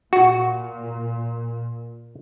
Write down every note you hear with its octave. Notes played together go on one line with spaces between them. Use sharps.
A#2 F#4